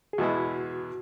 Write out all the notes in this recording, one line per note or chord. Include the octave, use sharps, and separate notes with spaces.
G#4
E2 B2 G#3 B3 E4 F#4